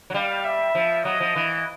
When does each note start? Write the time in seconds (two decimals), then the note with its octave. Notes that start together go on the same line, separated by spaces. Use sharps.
0.10 F#3
0.14 G3 F5
0.44 E5
0.75 F3
1.05 F#3 D#5
1.20 F3
1.36 E3